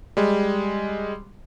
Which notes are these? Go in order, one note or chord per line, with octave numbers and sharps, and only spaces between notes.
G3 G#3